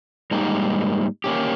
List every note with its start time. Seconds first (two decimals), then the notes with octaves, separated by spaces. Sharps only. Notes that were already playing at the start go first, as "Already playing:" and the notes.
0.31 G#2 G3 A#3 D#4 A#4
1.24 A#3 C#4 G4